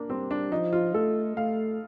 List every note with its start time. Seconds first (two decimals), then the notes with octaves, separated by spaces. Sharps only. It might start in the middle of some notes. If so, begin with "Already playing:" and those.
Already playing: A#3 D4
0.09 G3 C4
0.31 D4
0.52 F3 D#4
0.73 F4
0.94 A3 A4
1.36 A3 F5